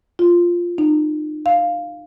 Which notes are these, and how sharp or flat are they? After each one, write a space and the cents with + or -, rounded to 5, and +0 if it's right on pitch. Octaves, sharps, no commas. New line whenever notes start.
F4 -5
D#4 -40
F5 +0